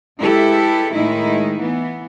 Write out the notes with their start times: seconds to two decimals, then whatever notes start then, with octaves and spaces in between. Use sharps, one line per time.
0.20 G#3 E4 G4 A4 B4 E5
0.93 A2 D#3 G#3 D#4 E4
1.61 E3 B3